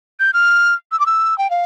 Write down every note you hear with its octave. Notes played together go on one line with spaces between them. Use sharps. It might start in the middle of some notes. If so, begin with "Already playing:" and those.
G6
F6
E6
D6
E6
G5
F5